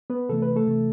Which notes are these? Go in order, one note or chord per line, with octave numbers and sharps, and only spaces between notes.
B3 B4
C3 E3 A3 A4
B4
A3 A4
C3 E3 A3